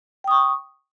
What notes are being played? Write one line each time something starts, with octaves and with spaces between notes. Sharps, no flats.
G5 C#6 D#6